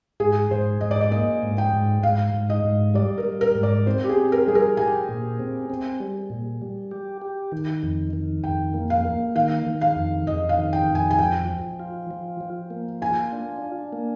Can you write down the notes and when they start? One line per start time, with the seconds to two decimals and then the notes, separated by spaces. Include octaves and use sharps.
0.20 G#2 G#4
0.51 G#2 C5
0.81 G#2 D#5
0.91 D5
1.01 D#5
1.11 A#3 D#5
1.43 G#2
1.58 G5
1.73 G#2
2.03 G#2 F5
2.34 G#2
2.50 D#5
2.64 G#2
2.94 G3 D5
3.18 A#4
3.25 G3
3.41 A#4
3.55 G#2
3.63 D5
3.86 C4 C5
4.04 G4
4.09 G#4
4.17 C4
4.32 A#4
4.47 G3 G#4
4.55 A#4
4.77 G4 G#5
5.09 A#2
5.39 C4
5.70 C4
6.00 G3
6.30 A#2
6.61 G3
6.91 G4
7.22 G4
7.52 D#3
7.83 F2
8.13 D#3
8.43 F2 G5
8.74 A#3
8.90 F5
9.05 A#3
9.35 D#3 F5
9.67 D#3
9.81 F5
9.96 F2
10.27 F2 D#5
10.49 F5
10.57 D#3
10.73 G5
10.88 F2
10.95 G#5
11.11 G#5
11.18 F3 G5
11.49 F3
11.80 F4
12.11 F3
12.41 F3
12.70 A#3
13.02 F4 G#5
13.33 D4
13.62 D4
13.93 A#3